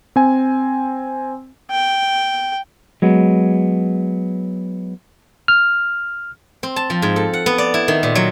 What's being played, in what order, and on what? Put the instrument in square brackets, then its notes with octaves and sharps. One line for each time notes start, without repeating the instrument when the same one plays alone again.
[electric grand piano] C4 G#5
[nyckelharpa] G5
[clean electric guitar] F#3 G#3 B3
[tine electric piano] F6
[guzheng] C4
A5
F3
G#2
A4
F#5
B3
D5
E4
D#3
A#2
F#3